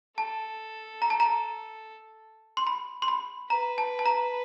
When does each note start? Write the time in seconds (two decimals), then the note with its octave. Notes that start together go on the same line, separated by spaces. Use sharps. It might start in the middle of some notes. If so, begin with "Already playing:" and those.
0.18 A4 A5
1.02 A#5
1.10 A5
1.20 A#5
2.57 C6
2.67 B5
3.02 C6
3.08 B5
3.50 B4 A#5
3.78 A5
3.99 A5
4.06 A#5